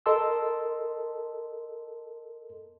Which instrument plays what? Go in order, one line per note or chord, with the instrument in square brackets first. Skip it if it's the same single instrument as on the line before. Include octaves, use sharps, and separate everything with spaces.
[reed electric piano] A4 A#4 D#5 A5 C6 E6